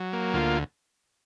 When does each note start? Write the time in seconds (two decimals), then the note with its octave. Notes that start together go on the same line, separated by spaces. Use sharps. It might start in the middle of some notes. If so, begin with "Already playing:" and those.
Already playing: F#3
0.13 A#3
0.34 D2 F4